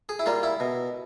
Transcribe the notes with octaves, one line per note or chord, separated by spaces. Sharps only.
G#4
E4
G3 A#3 F4
E4
B2